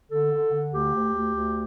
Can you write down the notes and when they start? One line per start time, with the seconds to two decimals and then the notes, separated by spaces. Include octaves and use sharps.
0.10 D3 A4
0.32 D3
0.52 D3
0.73 D2 G4
0.94 D2
1.14 D2
1.35 D2